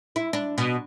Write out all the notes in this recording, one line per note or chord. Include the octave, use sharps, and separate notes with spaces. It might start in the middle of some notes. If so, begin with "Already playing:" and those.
E4
D4
B2